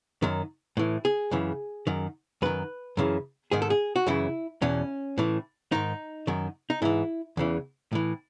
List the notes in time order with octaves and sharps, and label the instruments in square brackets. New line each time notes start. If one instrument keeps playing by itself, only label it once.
[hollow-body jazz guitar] F#2 D#3
A2 E3
G#4
F#2 C#3 E3
F#2 D#3
F#2 D#3 B4
F#2 C#3 E3
G#2 D#3 G#4
A4
G#4
F#4
F#2 C#3 E3 E4
E2 B2 C#4
A2 E3
G#2 D#3 D#4
F#2 D#3
D#4
G#2 E3 E4
E2 C#3 E3
A2 E3